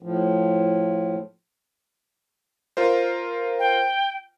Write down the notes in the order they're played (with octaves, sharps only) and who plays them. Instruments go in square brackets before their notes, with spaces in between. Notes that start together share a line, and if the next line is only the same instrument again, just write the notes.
[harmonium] A2 F3
[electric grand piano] F4 A#4 C5
[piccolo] G5